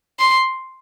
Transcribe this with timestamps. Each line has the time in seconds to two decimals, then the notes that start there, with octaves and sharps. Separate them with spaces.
0.19 C6